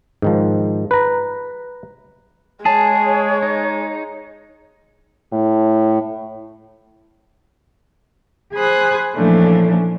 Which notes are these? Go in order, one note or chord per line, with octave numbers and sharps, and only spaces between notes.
G#2 D#3 F3
B4 A#5
G#3 G#4 C#5 A5
D#4
A2
G#4 C5 G#5 B5 D#6 F#6
A#2 E3 F3 A3 C#4 D4